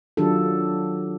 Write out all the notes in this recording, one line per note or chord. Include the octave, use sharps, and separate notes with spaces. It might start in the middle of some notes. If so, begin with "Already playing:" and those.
D#3 F#3 D4 F4 G4 A4